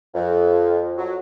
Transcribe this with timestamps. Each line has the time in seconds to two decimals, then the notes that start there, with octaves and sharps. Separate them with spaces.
0.15 F2
0.97 F#3